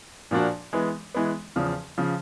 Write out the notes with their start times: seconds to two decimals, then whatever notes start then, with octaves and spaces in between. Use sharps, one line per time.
0.31 A#2 F3 A#3 D4 F#4
0.73 E3 G#3 B3
1.15 E3 G#3 B3
1.56 E2 C#3 F3
1.98 C#3 F3